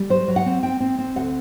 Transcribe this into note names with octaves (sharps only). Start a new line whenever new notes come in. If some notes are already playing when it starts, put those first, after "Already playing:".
Already playing: G3
F#3 C5
F#3
F#5
C4
C4 G5
C4
C4
D2 F#5